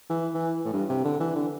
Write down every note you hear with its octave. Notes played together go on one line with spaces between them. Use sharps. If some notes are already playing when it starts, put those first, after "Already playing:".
E3
E3
A2
G2
C3
D3
E3
D3